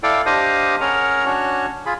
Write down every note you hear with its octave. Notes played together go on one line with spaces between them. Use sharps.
E4 A4 D5 F5 G5
D4 G4 C5 D#5 F5 D#6
C#4 G#4 A#4 C#5 F#5 A#5
C#4 D4 F#4 C#5
F4 G#4 B5